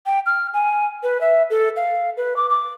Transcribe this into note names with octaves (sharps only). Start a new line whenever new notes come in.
G5
F6
G#5
B4
E5
A4
F5
B4
D6
D6